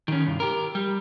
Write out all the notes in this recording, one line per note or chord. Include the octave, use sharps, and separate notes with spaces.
D#3 C#4
C2 G2
G4 A#4
G3